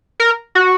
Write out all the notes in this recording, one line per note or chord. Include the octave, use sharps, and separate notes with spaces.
A#4
F#4